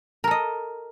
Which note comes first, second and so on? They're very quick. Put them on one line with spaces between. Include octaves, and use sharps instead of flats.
A#4 A4 D#5